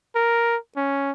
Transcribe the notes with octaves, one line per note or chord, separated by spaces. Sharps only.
A#4
C#4